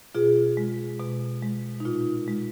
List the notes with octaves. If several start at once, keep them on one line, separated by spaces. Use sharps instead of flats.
B2 F4 G#4
G#3
B2
G#3
D#4
A#2 F4
G#3